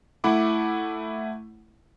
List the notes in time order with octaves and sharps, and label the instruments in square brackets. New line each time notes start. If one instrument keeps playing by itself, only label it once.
[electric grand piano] A3 E4 F#5 B5 D6